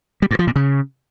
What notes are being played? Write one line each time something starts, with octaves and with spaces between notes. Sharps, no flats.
G3
G2
F3
A#2
C#3